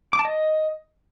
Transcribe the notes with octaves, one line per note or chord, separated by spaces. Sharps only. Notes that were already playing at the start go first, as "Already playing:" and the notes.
D6
A5
D#5